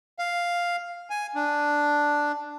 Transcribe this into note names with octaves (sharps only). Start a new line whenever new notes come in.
F5
G#5
D4